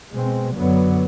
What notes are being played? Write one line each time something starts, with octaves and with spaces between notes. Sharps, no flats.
B2 G#3 C4
F#2 D3 F#3 B3